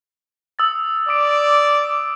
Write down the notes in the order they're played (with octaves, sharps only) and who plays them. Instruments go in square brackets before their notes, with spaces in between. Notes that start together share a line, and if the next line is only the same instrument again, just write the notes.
[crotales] D#6 E6 A6
[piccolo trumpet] D5 [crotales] D6 D7